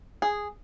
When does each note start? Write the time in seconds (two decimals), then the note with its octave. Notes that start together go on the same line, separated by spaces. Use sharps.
0.22 G#4